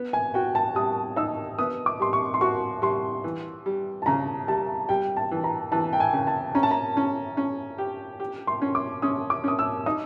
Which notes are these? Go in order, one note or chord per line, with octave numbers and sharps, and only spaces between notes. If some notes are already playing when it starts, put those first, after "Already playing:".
Already playing: B3
G#5
F#4 G5
A5
G3 D#6
D#4 E6
B3 D#6
D6
G3 C6
C#6
C6
F#4 C#6
G3 C6
E3
G3
A5
C#3 A#5
G3 A5
G3 G5
A5
E3
A#5
E3 A5
G5
G#5
C#3
A5
C#4 A#5
A5
A#5
C#4
C#4
G4
G4
C6
C#4
D6
C#4 D#6
D6
C#4 D#6
E6
D#4 D#6